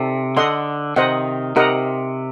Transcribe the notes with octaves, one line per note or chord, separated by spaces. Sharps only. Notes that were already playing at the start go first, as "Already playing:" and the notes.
Already playing: C3 D#4 A4 D5 A5
D3 A4 D#5 F#5 C6
C3 D#3 C5 D#5 F#5
C3 D#4 G4 A#4 D#5 F#5